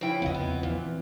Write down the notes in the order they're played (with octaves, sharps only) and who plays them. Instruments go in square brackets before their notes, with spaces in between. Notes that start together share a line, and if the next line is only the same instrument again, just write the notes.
[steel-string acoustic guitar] C#3 G5 [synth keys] F3 E4 B4
[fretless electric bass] E2 C#3 C4 [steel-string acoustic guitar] D#5 F#5
[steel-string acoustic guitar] B3
[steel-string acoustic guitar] A#2 [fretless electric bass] E3 C4